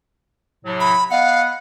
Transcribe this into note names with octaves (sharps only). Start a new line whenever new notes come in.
A2 C3 F#3
B5
B3 D#5 F5 F#5